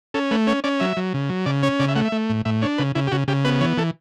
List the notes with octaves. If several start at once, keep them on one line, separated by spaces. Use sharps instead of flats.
C#4 A4
A3 B4
C#4 C#5
C#4 D5
F#3 E5
F#3
C#3
F#3
C#3 D5
C#4 C#5
C#3 D5
E5
A3 F#5
E5
A3
A2
A2 E5
D4 C#5
C#3 B4
C#3 E4
G4
C#3 F#4
C#3 G4
B3 B4
E3 C#5
E3 A4